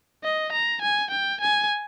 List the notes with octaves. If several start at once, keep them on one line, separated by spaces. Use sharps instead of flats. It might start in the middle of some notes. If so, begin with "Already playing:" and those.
D#5
A#5
G#5
G5
G#5